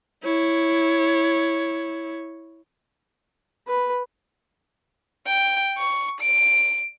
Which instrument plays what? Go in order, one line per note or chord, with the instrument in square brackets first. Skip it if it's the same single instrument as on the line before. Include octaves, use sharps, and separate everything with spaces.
[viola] E4 C#5
[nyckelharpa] B4
[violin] G5
C#6
D7